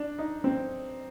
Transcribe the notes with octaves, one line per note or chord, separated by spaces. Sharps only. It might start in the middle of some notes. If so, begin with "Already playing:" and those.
Already playing: D4
D#4
C4